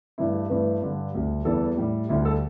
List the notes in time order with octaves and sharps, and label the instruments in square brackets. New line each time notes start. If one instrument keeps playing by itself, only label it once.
[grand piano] G2 E3 A3 E4
G4
G2 E3 A3 B4
G2 D3 G3
D2 D3 G3
E2 E3 G3 A4
A2 G3
D2 D3 G3 E4
A4